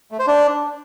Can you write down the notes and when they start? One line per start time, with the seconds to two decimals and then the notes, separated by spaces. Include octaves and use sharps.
0.11 A3
0.19 C5
0.27 D4